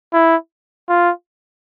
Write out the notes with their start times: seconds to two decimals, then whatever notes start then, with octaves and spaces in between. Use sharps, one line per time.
0.14 E4
0.89 F4